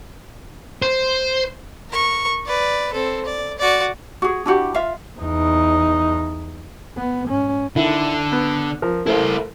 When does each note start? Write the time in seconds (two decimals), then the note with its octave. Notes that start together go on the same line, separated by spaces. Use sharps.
0.82 C5
1.90 A#4 C#6
2.46 B4 D5
2.93 C4 A4
3.26 D5
3.58 F#4 D5
4.22 F#4 G#4
4.46 D4 E4 F#4 G4
4.74 F4 E5 F5
5.19 E2 D#4
6.97 B3
7.27 G#2 C#4
7.76 D3 D#3 E4
8.32 B3
8.82 F3 A#4
9.06 A3 E4 A#4 C5